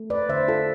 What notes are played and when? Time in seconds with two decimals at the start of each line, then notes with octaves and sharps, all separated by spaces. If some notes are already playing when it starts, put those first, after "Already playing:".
Already playing: A3
0.10 B4 D5
0.29 D3 C5 E5
0.48 F4 A4